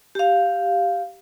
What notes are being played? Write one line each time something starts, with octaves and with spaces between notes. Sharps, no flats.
G4 F5